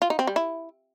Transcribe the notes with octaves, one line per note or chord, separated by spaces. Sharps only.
F4
D#4
C4
G3
E4